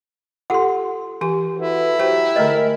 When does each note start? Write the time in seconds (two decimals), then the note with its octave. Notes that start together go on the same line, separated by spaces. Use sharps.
0.50 F4 G4 A4 F#5 C6
1.21 E3 G4 G#5
1.57 E4 F#4 A4 B4
1.99 F#3 G4 C5 G5
2.36 D3 G#3 A3 A#4 D#5 G5